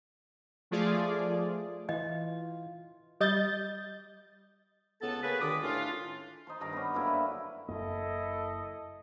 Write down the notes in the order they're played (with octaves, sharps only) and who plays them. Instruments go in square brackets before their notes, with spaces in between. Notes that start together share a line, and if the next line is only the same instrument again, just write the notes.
[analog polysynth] F3 A3 F4 G#4 D5
[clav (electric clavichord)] E3 [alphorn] F4 [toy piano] D#5
[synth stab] G3 D#5 G6 A6
[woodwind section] C#2 C#3 B3 A4 A5
A#3 C#4 G#4 B4
C#2 D3 D#3 G4 D6 D#6
A2 C#4 D4 F4
[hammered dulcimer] D#4 C5 C6
G2 D#3 A#5 D6
B3 C#4
F#2 D3 A#3 E4
B4
[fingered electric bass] F#1 F#2 A#3 [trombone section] E4 A4 [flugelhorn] D#5